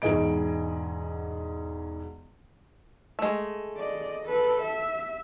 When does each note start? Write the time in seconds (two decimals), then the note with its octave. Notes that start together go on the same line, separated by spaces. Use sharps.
0.02 E1 G#2 G#4 D#5 D7
3.19 G#3 A3
3.77 D5 D#5
4.26 A4 B4
4.62 E5